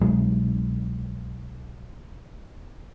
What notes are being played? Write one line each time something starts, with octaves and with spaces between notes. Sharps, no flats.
C2 B2 F#3 G#3